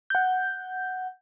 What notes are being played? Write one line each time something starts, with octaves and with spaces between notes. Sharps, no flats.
F#5 G6